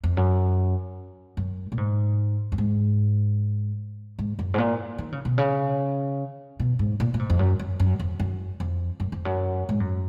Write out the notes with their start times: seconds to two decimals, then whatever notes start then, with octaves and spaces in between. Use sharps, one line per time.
0.04 F2
0.17 F#2
1.37 F#2
1.72 A#2
1.78 G#2
2.52 F#2
2.58 G#2
4.19 G#2
4.39 F#2
4.54 G#2
4.58 A#2
4.98 D#3
5.12 C#3
5.25 B2
5.38 C#3
6.60 B2
6.79 G#2
7.00 A#2
7.14 A#2
7.19 G#2
7.30 F2
7.39 F#2
7.59 F#2
7.80 F#2
8.00 F2
8.20 F#2
8.60 F2
9.00 F#2
9.12 F2
9.25 F#2
9.69 G#2
9.80 F#2